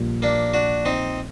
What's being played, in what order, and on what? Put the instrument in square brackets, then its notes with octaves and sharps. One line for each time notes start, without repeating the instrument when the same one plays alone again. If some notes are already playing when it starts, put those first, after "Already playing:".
Already playing: [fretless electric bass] A#1 A#2 G3
[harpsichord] A#3 D4
D4 F#4
C4 D#4